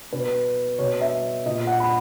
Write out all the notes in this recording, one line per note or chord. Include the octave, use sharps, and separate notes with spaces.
B2 B4
B2 C#5
E5
A#2 D#5
F#5
B5